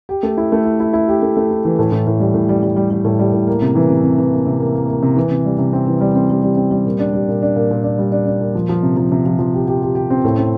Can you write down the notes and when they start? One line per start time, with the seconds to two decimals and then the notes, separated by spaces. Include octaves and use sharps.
0.09 G4
0.23 A3
0.37 E4
0.52 A3
0.65 E4
0.80 E4
0.93 E4
1.08 G4
1.22 A3
1.37 A3
1.51 E4
1.65 E3
1.79 A2
1.92 A2
2.07 A2
2.20 G3
2.34 A2
2.49 G3
2.63 G3
2.76 G3
2.91 G3
3.05 A2
3.19 G3
3.33 A2
3.47 A#3
3.62 C3
3.75 E3
3.90 C3
4.04 C3
4.18 E3
4.32 A#3
4.46 C3
4.60 A#3
4.75 A#3
4.88 A#3
5.03 C3
5.16 E3
5.31 C3
5.45 G3
5.58 C3
5.73 C4
5.87 E3
6.01 G3
6.15 C4
6.30 G3
6.43 G3
6.57 C4
6.71 G3
6.85 A#2
6.99 D4
7.13 G3
7.29 A#2
7.42 D4
7.56 A#2
7.71 A#2
7.84 D4
7.99 G3
8.12 D4
8.26 D4
8.41 A#2
8.55 F3
8.69 F3
8.83 C3
8.97 F3
9.12 C3
9.26 F3
9.39 F3
9.54 G4
9.67 G4
9.82 G4
9.95 G4
10.10 C4
10.25 A2
10.38 C4